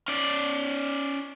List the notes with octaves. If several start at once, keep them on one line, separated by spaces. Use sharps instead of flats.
C#4 D5